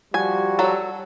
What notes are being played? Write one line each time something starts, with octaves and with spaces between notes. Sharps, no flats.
F3 G3 F#4 G#5
F#3 A4